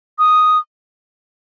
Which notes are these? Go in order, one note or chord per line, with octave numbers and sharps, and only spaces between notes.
D#6